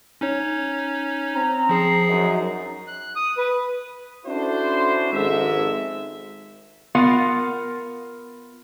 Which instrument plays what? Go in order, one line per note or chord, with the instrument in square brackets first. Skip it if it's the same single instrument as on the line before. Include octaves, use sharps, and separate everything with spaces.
[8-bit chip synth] C#4 D#4 C#5
[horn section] C4 A#5
[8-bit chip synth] F3 G#4 C7
[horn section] F#2 D#4
[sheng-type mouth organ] F#6
D#6
B4
[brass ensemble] C#4 D4 E4 F#4 A4 C5
G#1 F2 G#2 G#3 A4 E5
[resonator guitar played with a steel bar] B3 F4 A#4 F5 F#5